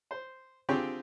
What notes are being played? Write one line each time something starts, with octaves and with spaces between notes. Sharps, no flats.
C5
D3 C4 F4 G4 G#4 C#6